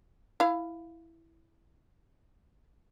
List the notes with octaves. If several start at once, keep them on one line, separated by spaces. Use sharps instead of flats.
E4 F5